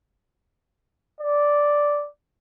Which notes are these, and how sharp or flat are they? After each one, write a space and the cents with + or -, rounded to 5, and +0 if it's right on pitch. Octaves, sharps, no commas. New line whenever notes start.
D5 -5